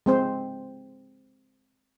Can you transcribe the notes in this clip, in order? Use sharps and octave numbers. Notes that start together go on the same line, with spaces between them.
G#3 C4 C5